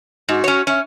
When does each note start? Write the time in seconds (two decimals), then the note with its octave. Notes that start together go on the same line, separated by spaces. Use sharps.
0.29 G#2 F#4
0.44 C#4 C#5
0.67 C#4 E5